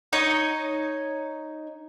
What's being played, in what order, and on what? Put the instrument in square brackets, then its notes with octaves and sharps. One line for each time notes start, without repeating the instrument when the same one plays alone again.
[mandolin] D#4 C#5 D#5